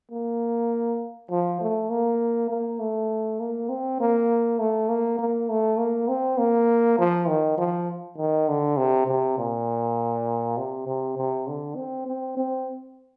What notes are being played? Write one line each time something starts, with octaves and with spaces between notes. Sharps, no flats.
A#3
F3
A3
A#3
A#3
A3
A#3
C4
A#3
A3
A#3
A#3
A3
A#3
C4
A#3
F3
D#3
F3
D#3
D3
C3
C3
A#2
C3
C3
C3
D3
C4
C4
C4